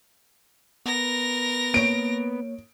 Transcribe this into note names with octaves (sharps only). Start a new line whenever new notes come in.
B3 A#4 A#6
A#3 C#5 D7